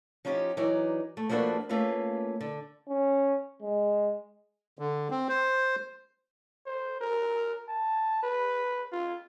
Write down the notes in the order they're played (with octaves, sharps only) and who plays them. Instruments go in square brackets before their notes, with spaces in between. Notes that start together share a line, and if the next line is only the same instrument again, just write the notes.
[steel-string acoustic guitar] F3 C#4 D#4 F4 G4
E3 F#3 D#4 B4 D5
A3
F3 A3 A#3 D4 F#4 B4
A3 A#3 C#4 F4 B4
D3
[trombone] C#4
G#3
[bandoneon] D3
C4
C5
[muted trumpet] C5
A#4
A5
B4
F4